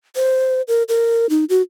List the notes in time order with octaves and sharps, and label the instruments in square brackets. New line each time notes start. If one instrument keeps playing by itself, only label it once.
[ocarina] C5
A#4
A#4
D#4
F#4